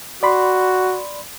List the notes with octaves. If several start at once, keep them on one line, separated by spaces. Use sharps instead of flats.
F#4 D5 B5 C6